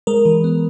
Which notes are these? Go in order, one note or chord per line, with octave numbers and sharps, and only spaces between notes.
G#3 A#4
E3
B3